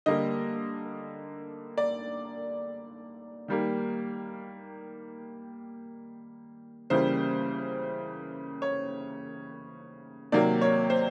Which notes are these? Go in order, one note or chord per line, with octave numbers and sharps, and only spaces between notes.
D3 G3 A#3 D#5
D5
D#3 G3 A#3
C#3 E3 G3 A#3 C5
C#5
C3 D#3 F#3 A#3 D5
C#5
C5